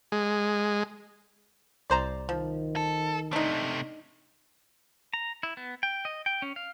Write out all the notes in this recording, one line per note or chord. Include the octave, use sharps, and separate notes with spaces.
G#3
C2 C5 D5 A#5
D#3 F3
A4
C3 A3 D4 D#4
A#5
E4
B3
G5
D#5
G5
C#4
F5